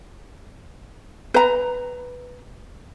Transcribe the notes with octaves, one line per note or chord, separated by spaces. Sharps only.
B4 A#5